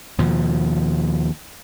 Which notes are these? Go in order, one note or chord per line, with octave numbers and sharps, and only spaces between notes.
D#2 B2 F3